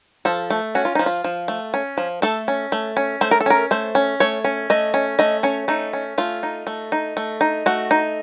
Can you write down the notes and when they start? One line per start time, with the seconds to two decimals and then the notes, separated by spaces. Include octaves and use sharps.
0.25 F3 A4
0.50 A3
0.75 C#4 F#4
0.85 F4
0.95 F3 D#4
1.06 F4
1.24 F3
1.48 A3
1.74 C#4
1.97 F3
2.22 A3 A4
2.48 C#4
2.72 A3
2.97 C#4
3.21 A3 C5
3.31 A#4
3.40 A4
3.46 C#4 A#4
3.71 A3 C5
3.95 C#4
4.20 A3 C#5
4.44 C#4
4.70 A3 D#5
4.94 C#4
5.19 A3 D#5
5.43 C#4 C#5
5.68 A3 D#4
5.93 C#4
6.18 A3 F4
6.43 D#4
6.67 A3
6.92 D#4
7.17 A3
7.41 D#4
7.66 A3 F#4
7.91 D#4